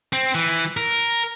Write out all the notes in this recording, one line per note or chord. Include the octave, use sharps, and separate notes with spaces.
C4
E3
A#4